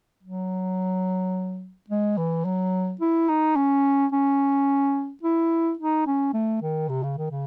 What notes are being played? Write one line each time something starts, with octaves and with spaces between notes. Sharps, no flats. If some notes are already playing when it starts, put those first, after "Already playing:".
F#3
G#3
E3
F#3
E4
D#4
C#4
C#4
E4
D#4
C#4
A3
D#3
C3
C#3
D#3
C#3